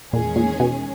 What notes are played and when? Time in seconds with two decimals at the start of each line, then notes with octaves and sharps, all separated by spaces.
0.12 E2 A#2 D#3 G#3 C#4 G#4
0.36 A#2
0.60 B2